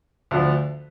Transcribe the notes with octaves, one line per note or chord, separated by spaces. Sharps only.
D2 D3 F3